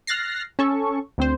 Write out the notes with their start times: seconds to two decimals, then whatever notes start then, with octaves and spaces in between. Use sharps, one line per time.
0.07 F6 F#6 A6 A#6 C7
0.59 C#4 A4 C#6
1.18 D2 C4 C5